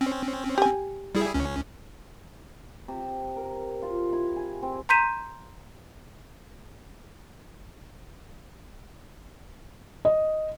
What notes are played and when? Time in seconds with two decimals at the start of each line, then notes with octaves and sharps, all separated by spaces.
0.01 C4 C#4
0.58 G4 G#5
1.15 G3 E4 G#4
1.34 C#2 C#4
2.88 C3
3.36 A#4
3.82 F4
4.13 E4
4.36 G#4
4.62 C4
4.89 A#5 C6 G6 B6 D#7 E7
10.05 D#5